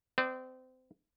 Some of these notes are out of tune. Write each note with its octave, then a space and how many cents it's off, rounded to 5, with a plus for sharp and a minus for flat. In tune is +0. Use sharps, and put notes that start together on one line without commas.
C4 -30 D5 +40